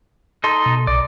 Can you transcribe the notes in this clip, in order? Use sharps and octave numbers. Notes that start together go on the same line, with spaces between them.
D#4 A4 C6
B2
B1 D5